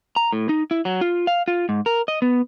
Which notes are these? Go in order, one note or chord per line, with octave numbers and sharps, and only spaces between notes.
A#5
A2
D#4
E4
F#3
F4
F5
F4
G#2
A#4
D#5
B3